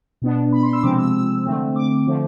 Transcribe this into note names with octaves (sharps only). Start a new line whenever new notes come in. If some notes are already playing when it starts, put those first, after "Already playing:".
B2 B3 D4
B5
C6
E6
C3 F3 G#3 C4 D6
E6
E6
D3 A3 C4
D6
D3 F3 A3